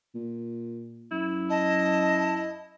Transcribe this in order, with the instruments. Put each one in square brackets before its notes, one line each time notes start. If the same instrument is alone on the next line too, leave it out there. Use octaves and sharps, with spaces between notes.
[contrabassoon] A#2
[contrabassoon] F#2 [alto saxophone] E4
[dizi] D#5 [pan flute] A5